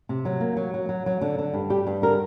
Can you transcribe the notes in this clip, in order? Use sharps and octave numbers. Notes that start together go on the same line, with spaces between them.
C3
F#3
A#3
F#3
F#3
F#3
F#3
D3
D3
G2
G3 G4
G2
D3 A#4